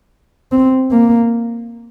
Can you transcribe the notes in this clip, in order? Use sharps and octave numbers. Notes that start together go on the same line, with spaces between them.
C4
A#3